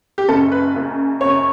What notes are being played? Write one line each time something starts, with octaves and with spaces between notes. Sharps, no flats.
G4
F#1 F#2 C#3 A4
B4
F#1 F#2 C#3
F#1 F#2 C#3 C#5